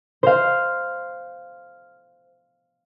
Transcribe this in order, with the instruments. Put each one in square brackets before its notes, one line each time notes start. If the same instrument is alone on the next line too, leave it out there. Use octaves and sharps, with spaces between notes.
[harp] C5 F5